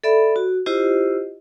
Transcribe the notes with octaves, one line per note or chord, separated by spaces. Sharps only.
A4 D5 E5 B5
F#4
E4 F4 G4 C5 D#5